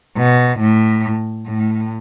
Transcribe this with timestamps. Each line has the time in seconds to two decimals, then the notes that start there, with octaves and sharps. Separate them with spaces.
0.17 B2
0.60 A2
1.47 A2